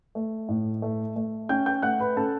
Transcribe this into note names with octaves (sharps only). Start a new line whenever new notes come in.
A3
A2
A3
A3
C#4 G5 G6
G5 G6
A3 F#5 F#6
B4 B5
C#4 A4 A5